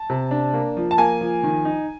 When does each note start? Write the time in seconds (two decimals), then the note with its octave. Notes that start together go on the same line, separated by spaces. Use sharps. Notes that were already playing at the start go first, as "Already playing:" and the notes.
Already playing: A5
0.10 C3
0.31 D4
0.54 A#3
0.77 F3
0.91 A5
0.98 A#3 G#5
1.21 F3
1.43 D#3
1.65 D#4